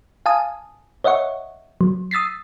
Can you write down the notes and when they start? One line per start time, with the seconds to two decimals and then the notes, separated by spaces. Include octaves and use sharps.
0.26 F5 G#5 A5 D#6
1.04 C#5 D#5 E5 F#5 C#6
1.81 F#3
2.11 D#6 E6 A6 B6 C7